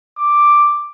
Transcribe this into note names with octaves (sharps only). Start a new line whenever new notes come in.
D6